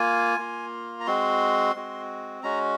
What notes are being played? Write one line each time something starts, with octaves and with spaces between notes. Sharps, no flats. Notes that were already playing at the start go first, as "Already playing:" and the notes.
Already playing: A#3 F4 G#5
A#3 F4
A#5
G#3 C4 F#4 C6
G#3 C4 F#4
G#3 C#4 F#4 A#5